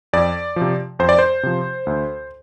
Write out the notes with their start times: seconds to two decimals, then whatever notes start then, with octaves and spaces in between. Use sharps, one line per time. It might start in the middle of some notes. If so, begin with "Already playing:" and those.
0.13 F2 D5
0.56 F3
0.61 C3
0.99 F2 C5
1.09 D5
1.19 C5
1.43 C3 F3
1.87 D2